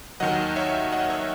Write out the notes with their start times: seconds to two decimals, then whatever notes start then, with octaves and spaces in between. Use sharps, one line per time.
0.20 D#2 D#3 F#3 D#5 F#5
0.56 C#5 E5
0.92 D#5 F#5
1.10 C#5 E5